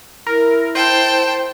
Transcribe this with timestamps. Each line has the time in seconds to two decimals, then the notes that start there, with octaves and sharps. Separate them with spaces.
0.27 E4 A#4
0.75 C5 G5 A5